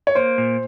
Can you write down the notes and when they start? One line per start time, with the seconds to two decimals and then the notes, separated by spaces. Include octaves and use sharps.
0.07 C#5
0.15 A#3 C5
0.38 A#2